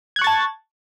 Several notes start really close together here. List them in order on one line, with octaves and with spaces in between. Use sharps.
G#6 F#6 C#6 A6 A5